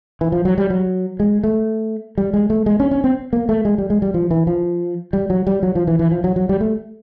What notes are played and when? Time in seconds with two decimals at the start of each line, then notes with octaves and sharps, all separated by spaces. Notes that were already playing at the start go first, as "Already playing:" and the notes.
0.21 E3
0.32 F3
0.45 F#3
0.58 G3
0.70 F#3
1.20 G#3
1.44 A3
2.18 G3
2.34 G#3
2.50 A3
2.66 G#3
2.80 C#4
2.91 C#4
3.04 C4
3.33 A#3
3.49 A3
3.65 G#3
3.78 G3
3.90 G#3
4.02 G3
4.14 F3
4.31 E3
4.47 F3
5.13 G3
5.30 F#3
5.47 G3
5.63 F#3
5.75 F3
5.87 E3
5.99 E3
6.12 F3
6.24 F#3
6.36 F#3
6.49 G3
6.61 A3